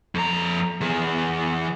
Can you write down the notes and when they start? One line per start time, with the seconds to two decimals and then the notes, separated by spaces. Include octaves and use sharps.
0.15 F2 A#5
0.81 E3 G#4